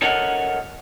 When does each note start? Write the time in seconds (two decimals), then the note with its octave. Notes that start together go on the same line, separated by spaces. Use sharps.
0.02 A4 A#4 C#5 D#5 F#5